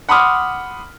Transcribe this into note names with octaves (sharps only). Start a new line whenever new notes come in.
F#5 B5 C6 D6 D#6 F6